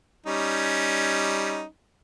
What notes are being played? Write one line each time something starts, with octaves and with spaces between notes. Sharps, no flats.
G3 C#4 D#4